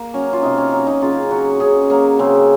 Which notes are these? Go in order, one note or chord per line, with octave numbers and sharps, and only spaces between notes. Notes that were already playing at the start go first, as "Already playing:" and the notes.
Already playing: A#3
F#3 C#4
F4
C3 D#4
C#4
F#3 D#4
D#4
C#3 F4
F#3 F#4
C#3 G#4
F#3 A#3
C#3 C4